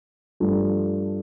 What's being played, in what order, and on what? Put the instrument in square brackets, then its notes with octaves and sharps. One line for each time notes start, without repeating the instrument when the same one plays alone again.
[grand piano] G2 F3 A3 D4 A4